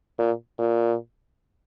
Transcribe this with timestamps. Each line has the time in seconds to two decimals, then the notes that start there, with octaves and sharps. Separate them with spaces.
0.19 A#2
0.59 A#2